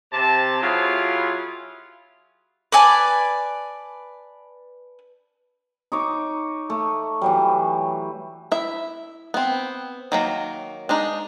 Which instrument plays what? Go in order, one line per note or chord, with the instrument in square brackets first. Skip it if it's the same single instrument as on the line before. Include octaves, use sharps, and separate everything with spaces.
[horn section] C3 A5
F#3 E4 F4 G4 G#4
[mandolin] B4 D5 G#5 A5
[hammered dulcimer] D#4 C#5 D6
A3
E3 F#3 G3
[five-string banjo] E4 E5
B3 C4
D#3 F#3 A#3
G#3 D4 D#4